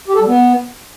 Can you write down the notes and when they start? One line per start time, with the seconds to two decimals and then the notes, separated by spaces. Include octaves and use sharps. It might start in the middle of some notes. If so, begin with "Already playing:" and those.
0.08 G4
0.15 A4
0.21 G3
0.28 B3